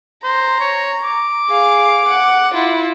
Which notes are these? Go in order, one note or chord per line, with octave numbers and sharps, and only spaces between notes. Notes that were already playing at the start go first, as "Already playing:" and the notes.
C5 A#5
C#5
D6
G#4 F5
F#5
E4 F4